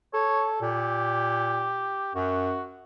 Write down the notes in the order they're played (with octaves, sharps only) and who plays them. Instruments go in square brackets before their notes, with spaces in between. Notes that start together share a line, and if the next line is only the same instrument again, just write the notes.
[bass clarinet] A4 [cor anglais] C#5
[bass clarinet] A#2 [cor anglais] G4
[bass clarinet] F#2 [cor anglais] F#4